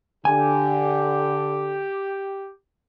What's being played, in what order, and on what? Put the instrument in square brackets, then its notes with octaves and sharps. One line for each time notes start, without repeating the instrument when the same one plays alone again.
[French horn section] D3 [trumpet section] G4 [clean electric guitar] G#5